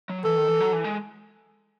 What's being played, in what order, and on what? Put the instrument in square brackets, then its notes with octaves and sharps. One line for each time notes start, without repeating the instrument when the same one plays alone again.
[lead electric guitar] F#3
[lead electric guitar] E3 [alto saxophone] A4
[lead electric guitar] D#3
E3
F#3
E3
G#3